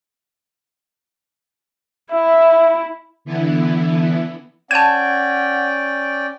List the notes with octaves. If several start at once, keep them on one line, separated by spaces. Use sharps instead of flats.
E4 E5
D3 E3 B3 E4
C#4 D5 F#5 G5 A5 G#6 D#7